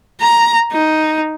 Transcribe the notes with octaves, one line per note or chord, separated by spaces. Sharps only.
A#5
D#4